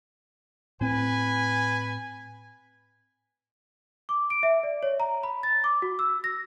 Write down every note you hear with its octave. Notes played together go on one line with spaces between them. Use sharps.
A2 C4 B4 G#5
D6
D7
E5
D5
C#5
A#5
B5
A6
D6
F#4
E6
A#6